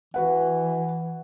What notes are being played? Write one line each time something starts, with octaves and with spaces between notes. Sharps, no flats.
E3 F#4 B4 F#5